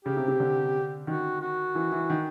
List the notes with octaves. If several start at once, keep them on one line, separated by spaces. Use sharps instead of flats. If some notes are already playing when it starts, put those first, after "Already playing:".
C#3 G4
C3
C3
D3
D#3 F#4
F#4
E3
E3
D#3